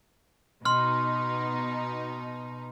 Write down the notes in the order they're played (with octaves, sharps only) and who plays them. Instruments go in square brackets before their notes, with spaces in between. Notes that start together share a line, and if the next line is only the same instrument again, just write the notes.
[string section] B2 D#4 [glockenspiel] C6 F6